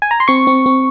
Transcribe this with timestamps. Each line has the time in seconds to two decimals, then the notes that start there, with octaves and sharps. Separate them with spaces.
0.02 G#5
0.11 A#5
0.20 C6
0.28 C4 C#6
0.47 C4
0.66 C4